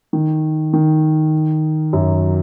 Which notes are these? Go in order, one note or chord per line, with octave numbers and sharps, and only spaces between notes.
D#3
D#3
F#2 F#3